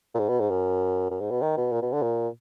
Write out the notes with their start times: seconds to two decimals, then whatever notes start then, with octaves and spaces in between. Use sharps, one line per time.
0.15 A#2
0.19 G#2
0.29 B2
0.40 G#2
0.50 F#2
1.11 F#2
1.20 G#2
1.31 B2
1.42 D#3
1.57 B2
1.72 A#2
1.82 B2
1.93 D3
2.02 A#2